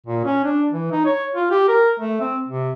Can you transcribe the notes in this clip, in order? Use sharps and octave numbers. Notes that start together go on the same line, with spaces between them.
A#2
C#4
D4
E3
D#4
C#5
F4
G4
A#4
A3
C4
C3